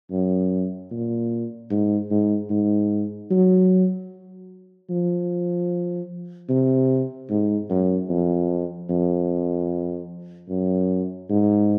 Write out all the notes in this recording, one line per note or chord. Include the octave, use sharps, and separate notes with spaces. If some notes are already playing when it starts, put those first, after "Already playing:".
F#2
A#2
G#2
G#2
G#2
F#3
F3
C3
G#2
F#2
F2
F2
F#2
G#2